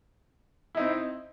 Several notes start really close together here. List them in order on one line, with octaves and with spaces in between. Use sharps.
E4 D#4 C4